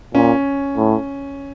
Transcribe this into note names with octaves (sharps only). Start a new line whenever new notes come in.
A#2 C#4
A2